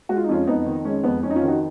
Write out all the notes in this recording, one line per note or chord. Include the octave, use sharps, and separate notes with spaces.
G#3 F#4
F4
D#4
F2 C#4 F4
F2 B3 D#4
D#3
G#3 C#4
F2 B3
F2 C#4
D#4
C#4 F4
D#3
D#4 F#4